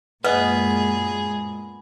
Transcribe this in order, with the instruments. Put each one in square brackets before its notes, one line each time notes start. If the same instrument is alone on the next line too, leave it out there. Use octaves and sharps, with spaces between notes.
[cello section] F#2 A#2 G#3 [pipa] B3 [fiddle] G#4 [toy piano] B4 D#5